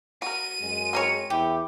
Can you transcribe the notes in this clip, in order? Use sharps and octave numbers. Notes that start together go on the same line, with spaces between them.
F#4 A#4 D#7
F#2 G#3
C4 A#4 C#5
E2 E4 G4